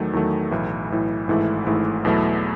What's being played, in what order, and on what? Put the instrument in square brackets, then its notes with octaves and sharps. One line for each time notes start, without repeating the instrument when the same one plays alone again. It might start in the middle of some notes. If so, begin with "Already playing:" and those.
Already playing: [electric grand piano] E2 D#3 F#3 A3
E2 D#3 F#3 A3
B1 A2 E3
B1 A2 E3
G#1 G#2 E3 A3 E4
G#1 G#2 E3 A3 E4
E2 B2 F#3 A3 E4